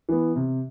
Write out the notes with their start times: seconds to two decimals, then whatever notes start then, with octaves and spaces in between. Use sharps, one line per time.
0.09 E3 B3
0.36 C3